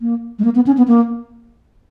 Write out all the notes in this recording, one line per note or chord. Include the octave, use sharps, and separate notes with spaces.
A#3
G#3
A#3
B3
C#4
B3
A#3